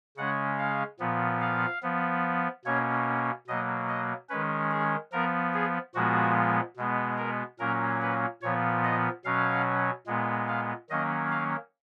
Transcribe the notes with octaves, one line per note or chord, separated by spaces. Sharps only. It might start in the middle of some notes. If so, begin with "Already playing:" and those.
C#3 G#3 C#4 F#5
F5
A#2 F3 B3
F5
F3 B3
B2 A#3 C#4 C#5
B2 F#3 A#3 D#5
D#5
D#3 G#3 C#4 B4
G#4
F3 B3 A#4
G#4
A#2 F3 G#3 B3 F#4
B2 G#3 B3
A#4
A#2 F#3 A#3 C#4 A#4
B4
A#2 F3 B3 C#5
D#5
B2 F#3 C#4 F5
A#2 G#3 B3
F5
D#3 F#3 A#3 C#4 D#5
F5